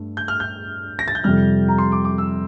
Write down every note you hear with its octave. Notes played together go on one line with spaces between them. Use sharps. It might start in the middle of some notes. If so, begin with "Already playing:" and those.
Already playing: G2 A3
G6
F6
G6
A#6
A6
G6
F2 C3 G3 F6
A#5
C6
D6
D6
E6